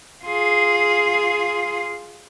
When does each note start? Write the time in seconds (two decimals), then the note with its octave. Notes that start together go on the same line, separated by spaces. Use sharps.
0.24 F4 G#4